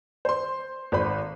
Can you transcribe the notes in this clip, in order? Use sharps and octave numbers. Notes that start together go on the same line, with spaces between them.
C5 C6
G#1 A4 C5 B5